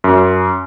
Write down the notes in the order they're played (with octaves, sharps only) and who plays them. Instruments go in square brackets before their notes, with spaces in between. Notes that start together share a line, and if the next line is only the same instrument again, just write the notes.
[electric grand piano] F#2